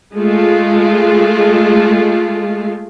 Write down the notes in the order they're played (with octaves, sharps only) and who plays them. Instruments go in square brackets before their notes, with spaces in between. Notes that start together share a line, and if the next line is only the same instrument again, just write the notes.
[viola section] G#3 A3 F4